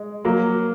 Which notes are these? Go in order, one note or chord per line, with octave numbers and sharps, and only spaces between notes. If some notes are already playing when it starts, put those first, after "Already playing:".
Already playing: G#3
F#3 A#3